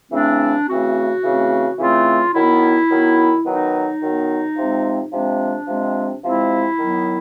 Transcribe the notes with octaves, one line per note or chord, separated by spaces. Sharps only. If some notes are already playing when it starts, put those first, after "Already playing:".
C#3 E3 A3 C4 D4
C#3 E3 A3 C4 F#4
C#3 E3 A3 C4
C#3 E3 A3 C4 F4
D#3 F#3 B3 E4
D#3 F#3 B3
D#3 F#3 B3 D#4
D#3 F#3 B3
C3 F3 G#3 C4
C3 F3 G#3 C4 D4
C3 F3 G#3 C4
C3 F3 G#3 C4 E4
D#3 F#3 B3